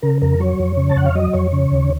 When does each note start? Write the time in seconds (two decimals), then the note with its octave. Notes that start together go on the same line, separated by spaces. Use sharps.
0.02 C#3 A#4
0.22 F2 A#4
0.40 F#3 C#5
0.59 F2
0.77 C#3
0.89 A5
0.96 F2 F#5
1.06 F5
1.15 F#3 D#5
1.33 F2 C#5
1.52 C#3
1.71 D#2